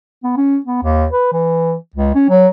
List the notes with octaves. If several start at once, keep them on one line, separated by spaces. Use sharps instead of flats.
B3
C#4
B3
D#2
B4
E3
C#2
C#4
F#3